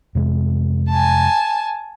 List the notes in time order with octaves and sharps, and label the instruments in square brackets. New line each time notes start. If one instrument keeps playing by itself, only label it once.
[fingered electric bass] F2 C3 G#3
[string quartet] G#5 A5